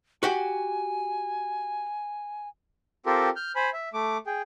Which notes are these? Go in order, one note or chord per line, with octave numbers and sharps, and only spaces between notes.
F#4 G4 F#5 G#5
C4 F4 G4 A4 A#4
F6 G6
C5 G#5 B5
E5
A3 D6
G#4 G5